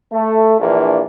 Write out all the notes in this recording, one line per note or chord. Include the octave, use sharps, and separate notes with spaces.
A3
A#1 E3 A#3 D4